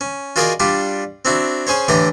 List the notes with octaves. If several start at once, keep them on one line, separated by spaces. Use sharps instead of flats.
C#4
F4 F#4 G#4 A#4 D5 D#5
G3 D4 F4 G4
C4 D4 E4 F#4
C#4 G#4 C5 C#5
A2 D3 E3 G4 D5 A#5